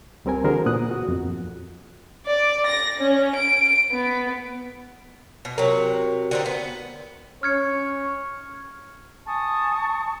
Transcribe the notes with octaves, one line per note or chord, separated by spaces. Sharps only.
C#2 G3 C4 A#4 G#5
D3 E3 F#4 G#4 A#4 C5
A#2 B3 D#6 F#6
F#4
F2
D5
A#6
C#4
D7
B3
B2
C3 F#3 A#4
D3 C4 D#4
B3
C#4 C#5 F6 G#6 C#7
G#5 A5 C#6 D#6